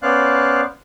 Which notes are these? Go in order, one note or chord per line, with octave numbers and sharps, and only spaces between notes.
B3 C#4 C5 D5 F5 F#6